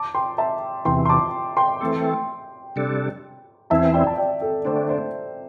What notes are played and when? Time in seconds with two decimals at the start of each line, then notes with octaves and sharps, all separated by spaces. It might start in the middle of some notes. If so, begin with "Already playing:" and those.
Already playing: A5 D6
0.15 G5 C6
0.38 E5 A5
0.85 E2 C3 E3 G5 C6
1.05 C6
1.09 A5 D6
1.57 G5 C6
1.81 E3 A3 C4 A4
2.76 C3 G3 D4 A4
3.70 E2 E3 C4 E4 E5 A5
3.94 D5 G5
4.07 A5
4.18 D5 G5
4.41 A4
4.65 D3 A3 D4 C5
4.89 C5